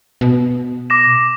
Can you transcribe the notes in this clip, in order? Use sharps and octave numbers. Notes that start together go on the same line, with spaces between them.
B2
D6 A#6 E7